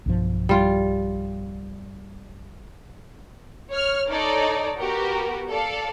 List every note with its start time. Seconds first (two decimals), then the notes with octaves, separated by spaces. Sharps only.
0.06 B1 G2 F3
0.49 G3 F4
3.72 C#5 F6
4.10 D#4 A4 C#5 D5
4.77 B3 F#4 G4 A#4
5.48 A4 D5 F5